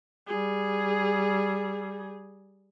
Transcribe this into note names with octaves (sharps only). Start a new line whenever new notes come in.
G3 G#4